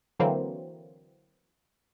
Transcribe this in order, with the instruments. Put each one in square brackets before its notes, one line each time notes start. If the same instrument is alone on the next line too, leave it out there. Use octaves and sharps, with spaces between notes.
[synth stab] D3 E3 F#3 A#3 C4